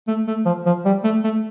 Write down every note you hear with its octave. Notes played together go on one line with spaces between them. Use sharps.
A3
A3
F3
F3
G3
A3
A3